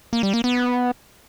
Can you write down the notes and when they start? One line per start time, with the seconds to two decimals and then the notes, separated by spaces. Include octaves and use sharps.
0.13 A#3
0.23 G3
0.34 A#3
0.44 B3